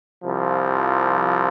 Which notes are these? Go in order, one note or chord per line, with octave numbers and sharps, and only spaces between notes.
C2 C3 F3